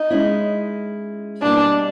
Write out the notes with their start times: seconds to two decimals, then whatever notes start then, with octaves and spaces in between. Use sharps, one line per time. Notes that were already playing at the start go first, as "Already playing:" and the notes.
Already playing: D#4
0.10 G#3 C#4 E4
1.42 B2 G3 A#3 D4